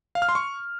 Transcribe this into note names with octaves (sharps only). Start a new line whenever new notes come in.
F5
F6
C6
C#6